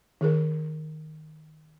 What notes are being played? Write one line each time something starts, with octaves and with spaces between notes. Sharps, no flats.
D#3 G#4 A#4